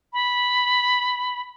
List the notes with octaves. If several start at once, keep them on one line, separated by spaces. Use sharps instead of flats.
B5